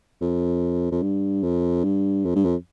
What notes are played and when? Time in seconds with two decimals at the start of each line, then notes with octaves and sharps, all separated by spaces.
0.21 F2
0.92 F2
1.03 G2
1.44 F2
1.84 G2
2.25 F2
2.35 G2
2.45 F2